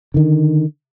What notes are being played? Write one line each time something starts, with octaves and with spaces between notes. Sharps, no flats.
D3 D#3